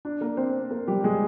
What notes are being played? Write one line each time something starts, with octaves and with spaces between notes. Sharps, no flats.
D4
A#3 A#4
C4 C5
A#3 A#4
G3 G4
G#3 G#4